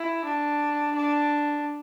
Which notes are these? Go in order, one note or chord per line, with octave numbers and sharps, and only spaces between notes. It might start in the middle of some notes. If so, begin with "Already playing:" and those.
Already playing: E4
D4
D4